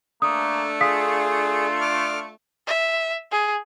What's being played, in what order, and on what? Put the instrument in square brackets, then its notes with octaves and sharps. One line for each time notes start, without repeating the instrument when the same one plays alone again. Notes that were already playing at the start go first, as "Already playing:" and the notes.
[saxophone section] A3 D4 [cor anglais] A#3 [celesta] D#6
[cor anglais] F4 [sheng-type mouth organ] G#4 [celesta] F5 D#6 B6
[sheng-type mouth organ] D6 F6
[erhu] E5
G#4